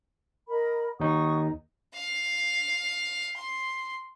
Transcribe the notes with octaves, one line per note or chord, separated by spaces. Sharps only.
A#4 D#5 B5
D#2 D#4 F#5 C#6 D#6
F5
C6